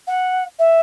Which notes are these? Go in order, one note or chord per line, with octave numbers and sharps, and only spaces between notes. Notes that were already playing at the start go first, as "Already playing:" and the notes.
F#5
E5